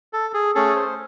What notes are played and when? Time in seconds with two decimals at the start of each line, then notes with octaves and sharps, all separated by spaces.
0.13 A4
0.34 G#4
0.55 A3 C#4 G#4 A4
0.76 C5